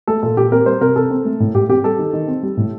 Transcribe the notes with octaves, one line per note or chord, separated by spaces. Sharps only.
A3 A4
A#2 A4
A#2 G4
C4 A#4
G3 C5
C3 A#4
C3 A4
C4
A3
A2
A2 G4
C4 G4
G3 A4
D#3
D#3
C4
G3
A2